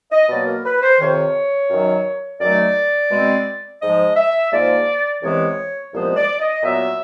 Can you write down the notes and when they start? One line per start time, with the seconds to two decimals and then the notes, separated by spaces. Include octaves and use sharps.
0.12 D#5
0.29 B2 F#3 A#3 D5
0.47 A#4
0.65 B4
0.82 C5
1.00 F2 C3 D#3 C#5
1.70 F#2 D#3 F#3
2.40 F#2 D#3 F#3 A3 D5
3.11 B2 G#3 C4
3.81 G#2 F3 G#3 D#5
4.17 E5
4.52 G#2 F3 A#3 D5
5.23 C2 C3 E3 G#3 B3 C#5
5.93 C2 A#2 F3 G#3 B3 C5
6.16 D5
6.40 D#5
6.63 A#2 F#3 B3 E5